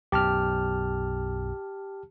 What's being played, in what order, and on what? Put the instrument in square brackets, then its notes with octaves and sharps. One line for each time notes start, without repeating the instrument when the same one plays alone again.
[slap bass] B1 F#2 [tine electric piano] G4 A5 F6